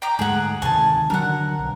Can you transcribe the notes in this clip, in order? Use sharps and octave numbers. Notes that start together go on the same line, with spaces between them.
G5 A#5 D6
D2 G#2 G#3 G#4 F#5
D2 C3 D#3 G#5 A5
D3 F#3 D4 A#4 F#5
B1